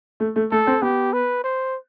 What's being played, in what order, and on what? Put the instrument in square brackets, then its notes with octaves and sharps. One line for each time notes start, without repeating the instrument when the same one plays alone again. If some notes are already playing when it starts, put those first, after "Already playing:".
[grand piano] A3
A3
[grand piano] A3 [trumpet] A4
[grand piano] C4
[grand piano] B3 [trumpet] G4
[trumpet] B4
C5